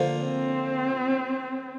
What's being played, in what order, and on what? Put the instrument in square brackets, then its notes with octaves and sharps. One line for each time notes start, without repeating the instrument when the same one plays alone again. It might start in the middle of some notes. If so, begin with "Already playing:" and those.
Already playing: [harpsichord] D3 F3 A#3
[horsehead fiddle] C4